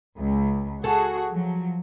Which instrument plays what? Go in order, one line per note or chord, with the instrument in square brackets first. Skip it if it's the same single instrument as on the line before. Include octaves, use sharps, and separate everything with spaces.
[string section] C#2
[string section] F#4 G#4 [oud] A4
[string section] F3 F#3